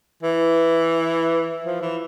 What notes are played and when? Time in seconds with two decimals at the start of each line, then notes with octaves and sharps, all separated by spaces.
0.23 E3
1.64 F3
1.82 E3